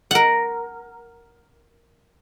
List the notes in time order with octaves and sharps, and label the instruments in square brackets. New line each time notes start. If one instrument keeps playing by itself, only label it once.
[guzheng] A#4 F#5